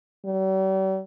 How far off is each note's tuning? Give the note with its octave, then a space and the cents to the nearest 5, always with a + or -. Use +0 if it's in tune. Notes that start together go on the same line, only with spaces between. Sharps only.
G3 -45